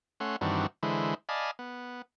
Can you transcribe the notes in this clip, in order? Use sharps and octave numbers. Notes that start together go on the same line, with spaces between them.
A3 C#4 F#5 C6
G2 D#3 E3 C4 D4 F#4
D3 E3 G#3 E4 C5
D5 D#5 F5 G#5 A5 B5
B3